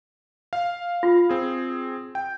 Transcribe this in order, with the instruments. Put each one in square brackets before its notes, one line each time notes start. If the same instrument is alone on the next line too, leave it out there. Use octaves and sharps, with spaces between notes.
[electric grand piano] F5
[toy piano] F4
[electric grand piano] C4 G#4
G5